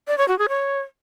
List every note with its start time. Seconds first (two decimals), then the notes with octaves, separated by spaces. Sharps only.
0.08 D5
0.18 C#5
0.28 F#4
0.39 G#4
0.49 C#5